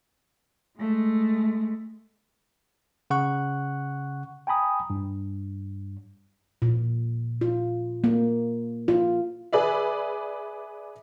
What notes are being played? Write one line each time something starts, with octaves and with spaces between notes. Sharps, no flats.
G#3 A3
C#3 F#5 C#6 F#6
G5 G#5 A#5 B5 D#6
G2
A#2
F4
A#3
F4
G#4 B4 D5 E5